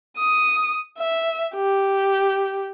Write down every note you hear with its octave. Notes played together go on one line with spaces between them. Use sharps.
D#6
E5
G4